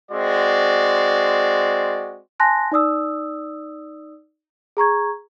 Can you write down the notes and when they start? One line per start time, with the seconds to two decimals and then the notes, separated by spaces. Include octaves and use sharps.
0.12 G#3 C4 F#4 D5
2.40 G#5 A5 C6 F#6 A#6
2.72 D#4 D5 D#6 E6
4.77 G#4 A#5 C#6 G#6